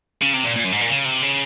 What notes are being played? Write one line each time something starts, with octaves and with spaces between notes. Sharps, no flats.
C#3
C3
A#2
A#2
F#2
G#2
A#2
C#3
C3
C#3